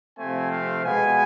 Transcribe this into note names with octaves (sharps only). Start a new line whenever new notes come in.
C3 F3 A3 C4 G#5
F5
B2 G#3 B3 G#5